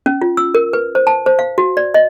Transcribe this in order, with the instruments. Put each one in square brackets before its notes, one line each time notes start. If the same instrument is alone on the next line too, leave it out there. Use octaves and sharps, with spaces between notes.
[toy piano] C#4
F4
E6
A#4
B4
C5
A5
C5
F5
F#4
D5
D#5